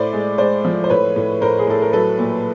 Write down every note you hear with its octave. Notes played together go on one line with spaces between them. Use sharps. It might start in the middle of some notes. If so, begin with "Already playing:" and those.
Already playing: A2 C5 D5
G#3
G#3 C5 D5
F3
C5
A2 B4 C#5
A2
A2 A#4 C5
G#4
A2 A4
A#4
F#3 A4 B4
A#2